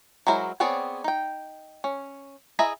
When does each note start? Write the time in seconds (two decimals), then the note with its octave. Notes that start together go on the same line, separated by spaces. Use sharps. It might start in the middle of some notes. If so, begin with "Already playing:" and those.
0.27 F#3 G#3 E4 A#4 C5
0.60 B3 C4 G#4 C#5 D5
1.04 D#4 G5
1.84 C#4
2.59 E4 G#4 D#5 E5 A#5